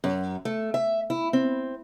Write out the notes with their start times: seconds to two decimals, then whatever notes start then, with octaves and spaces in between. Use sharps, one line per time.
0.04 F#2
0.45 A3
0.74 E5
1.10 E4
1.33 C4